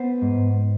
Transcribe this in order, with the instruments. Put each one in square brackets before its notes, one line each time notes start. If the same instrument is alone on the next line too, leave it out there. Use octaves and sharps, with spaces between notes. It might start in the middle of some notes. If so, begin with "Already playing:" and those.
Already playing: [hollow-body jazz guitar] B3 C5
G#2